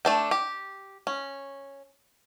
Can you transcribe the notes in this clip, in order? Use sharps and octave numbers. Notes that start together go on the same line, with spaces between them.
A3 D4 G5
G4
C#4